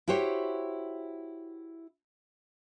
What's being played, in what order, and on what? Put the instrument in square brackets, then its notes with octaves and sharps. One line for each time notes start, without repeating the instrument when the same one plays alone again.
[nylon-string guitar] E4 F#4 G4 C5 C#5